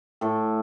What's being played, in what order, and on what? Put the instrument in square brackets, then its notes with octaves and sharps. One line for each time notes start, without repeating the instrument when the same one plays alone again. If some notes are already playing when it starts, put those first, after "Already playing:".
[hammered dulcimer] A2 A4